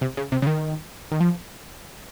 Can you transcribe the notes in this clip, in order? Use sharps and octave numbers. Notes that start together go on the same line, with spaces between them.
C3
C#3
C3
C#3
D#3
D#3
F3